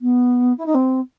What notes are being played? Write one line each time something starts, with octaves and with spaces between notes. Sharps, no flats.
B3
E4
D#4
C4